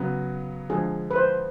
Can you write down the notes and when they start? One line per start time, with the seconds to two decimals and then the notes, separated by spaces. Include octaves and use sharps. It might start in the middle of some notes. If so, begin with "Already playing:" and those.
Already playing: C#3 F#3 B3
0.70 D3 F3 G#3 G#4
1.11 B4
1.16 C5